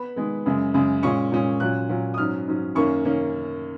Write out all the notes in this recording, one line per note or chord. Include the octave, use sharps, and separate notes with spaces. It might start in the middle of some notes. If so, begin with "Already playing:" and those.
Already playing: B3 B5
D#3 G#3 B3
F#2 C#3 G#3
F#2 C#3 G#3
A#2 G#3 C#4 C#6
A#2 G#3 C#4
A#2 F#3 C#4 F#6
A#2 F#3 C#4
D#6
G#2 F#3 C#4 F6
G#2 F#3 C#4
F#2 D#3 A#3 C#4 C#6
D#3 A#3 C#4